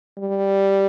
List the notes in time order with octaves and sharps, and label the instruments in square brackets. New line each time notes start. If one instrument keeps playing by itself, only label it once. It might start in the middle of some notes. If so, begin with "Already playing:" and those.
[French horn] G3